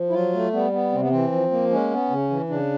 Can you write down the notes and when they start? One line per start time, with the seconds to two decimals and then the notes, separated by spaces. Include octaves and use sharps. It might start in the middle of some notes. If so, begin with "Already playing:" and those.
Already playing: F3
0.09 E4
0.13 F#3 F4
0.33 A3
0.53 G3 B3
0.73 B3
0.92 C3 C4
1.00 B3
1.09 E3 C4
1.32 F3
1.51 A#3
1.70 G#3 C#4
1.90 B3
2.10 C#3
2.30 E3
2.49 C#3 D4